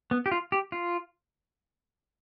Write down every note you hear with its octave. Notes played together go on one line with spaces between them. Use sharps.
B3
G4
F4
G4
F4